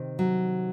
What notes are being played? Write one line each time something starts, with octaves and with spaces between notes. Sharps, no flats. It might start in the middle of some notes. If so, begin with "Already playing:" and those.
Already playing: C3 D#3
F#3